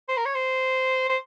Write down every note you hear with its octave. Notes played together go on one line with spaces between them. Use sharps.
C5
A#4
C#5
C5
C5